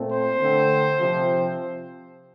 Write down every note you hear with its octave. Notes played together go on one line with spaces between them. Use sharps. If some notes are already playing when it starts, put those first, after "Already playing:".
Already playing: A#2 A3 C4
C5
D3 A3 C4
C3 F3 C4